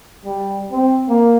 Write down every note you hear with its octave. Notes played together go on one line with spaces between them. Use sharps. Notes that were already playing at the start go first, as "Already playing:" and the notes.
G3
C4
A#3